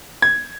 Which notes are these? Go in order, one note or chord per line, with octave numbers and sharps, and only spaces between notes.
G#6